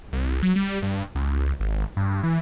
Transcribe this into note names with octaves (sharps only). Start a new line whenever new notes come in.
C2
F#3
G3
G2
C#2
G#1
G2
E3